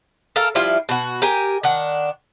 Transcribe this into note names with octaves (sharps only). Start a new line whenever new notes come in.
A4 A#4 F5
F3 G3 E4 F4
B2 F#4
G4 A#4 G#5
D#3 D4 F#5